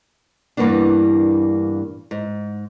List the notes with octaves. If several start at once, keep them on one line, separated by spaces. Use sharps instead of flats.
G2 E3 A#3 B3 D4
G#2